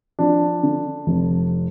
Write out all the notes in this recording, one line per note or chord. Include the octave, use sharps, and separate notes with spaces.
F3 D4
D3
F1